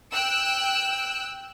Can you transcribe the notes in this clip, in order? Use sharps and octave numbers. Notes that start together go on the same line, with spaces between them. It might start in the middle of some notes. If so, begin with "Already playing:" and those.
G5 E6 F#6